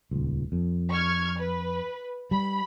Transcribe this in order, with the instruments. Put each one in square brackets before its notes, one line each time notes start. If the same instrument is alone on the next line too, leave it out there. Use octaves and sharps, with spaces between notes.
[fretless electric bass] D#1 C#2
F2
[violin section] C#6 F6 G#6
B4
[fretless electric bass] G3 [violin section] B5